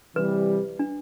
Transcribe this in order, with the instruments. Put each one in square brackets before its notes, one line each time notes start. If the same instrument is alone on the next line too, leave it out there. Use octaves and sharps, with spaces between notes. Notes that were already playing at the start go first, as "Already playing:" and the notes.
[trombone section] C3 E3 G3 [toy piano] B4
[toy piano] D4